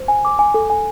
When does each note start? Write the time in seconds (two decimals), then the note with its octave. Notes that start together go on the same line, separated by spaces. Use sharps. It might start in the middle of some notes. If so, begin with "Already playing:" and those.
Already playing: C5
0.08 G#5
0.25 D6
0.39 G#5
0.54 A4
0.70 G#5